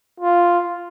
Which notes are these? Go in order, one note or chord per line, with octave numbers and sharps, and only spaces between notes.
F4